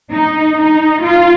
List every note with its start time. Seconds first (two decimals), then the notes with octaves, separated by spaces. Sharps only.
0.13 D#4
0.57 D#4
1.03 F4